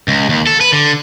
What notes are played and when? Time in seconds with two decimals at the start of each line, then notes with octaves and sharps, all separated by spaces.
0.08 C#2
0.29 D#2
0.47 A4
0.61 B4
0.72 D3